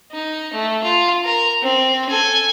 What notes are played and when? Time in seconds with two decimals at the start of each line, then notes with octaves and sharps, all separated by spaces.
0.12 D#4
0.53 A3
0.84 F4
1.24 A#4
1.62 C4
2.10 A4 G#5